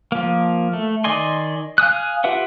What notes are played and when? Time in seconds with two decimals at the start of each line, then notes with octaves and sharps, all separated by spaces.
0.12 F3 A#3
0.73 A3
1.04 D#3 D5 D#5 G#5 C6
1.78 F5 G#5 D#6 F#6
2.24 F4 G4 B4 E5 F#5